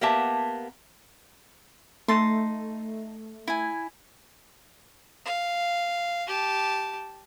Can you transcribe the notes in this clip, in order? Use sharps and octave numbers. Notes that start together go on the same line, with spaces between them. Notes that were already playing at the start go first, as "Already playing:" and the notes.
A#3 B3 G4 E5 A5
A3 D#4 A5 C6
E4 G#5
F5
G4 A5